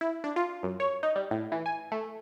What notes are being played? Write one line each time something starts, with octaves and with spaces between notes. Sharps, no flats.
E4
D4
F4
F#2
C#5
D#4
G3
A2
E3
G#5
A3